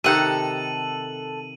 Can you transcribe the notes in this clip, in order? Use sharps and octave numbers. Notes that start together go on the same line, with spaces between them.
C3 D#3 D#4 A4 F#5 D#7 F#7